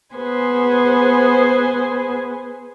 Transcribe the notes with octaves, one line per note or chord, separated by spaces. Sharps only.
B3 G#4 B4 C5 G#5